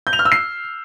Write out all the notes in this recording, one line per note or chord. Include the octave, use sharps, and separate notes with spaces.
G6
F7
F6
E6
C7